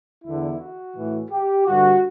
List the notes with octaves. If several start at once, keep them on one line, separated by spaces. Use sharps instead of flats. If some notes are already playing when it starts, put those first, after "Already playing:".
E2 D3 E4
F#4
A2 E3
G4
G2 D3 F#4